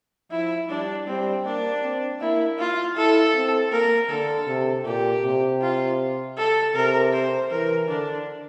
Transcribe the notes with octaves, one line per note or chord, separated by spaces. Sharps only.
F3 E4
G3 D4
G3 C4
A#3 D4
C4
A#3 E4
F4
E4 A4
C4
A#3 A#4
D3 A4
C3
A#2 G4
C3
F4
A4
C3 A#4
C5
E3 A#4
D3 D4